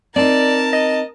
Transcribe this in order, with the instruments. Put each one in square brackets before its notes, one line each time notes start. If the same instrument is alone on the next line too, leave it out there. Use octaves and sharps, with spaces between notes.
[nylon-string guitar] C4 D#4 [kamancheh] A#4 A5 [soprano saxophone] D5
[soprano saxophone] D#5